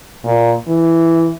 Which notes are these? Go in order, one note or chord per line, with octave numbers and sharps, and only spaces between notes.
A#2
E3